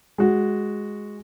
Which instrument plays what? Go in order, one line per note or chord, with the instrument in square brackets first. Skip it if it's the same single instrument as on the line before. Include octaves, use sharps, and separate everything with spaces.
[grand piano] G#3 F#4